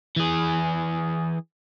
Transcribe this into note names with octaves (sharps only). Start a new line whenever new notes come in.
E3 G#4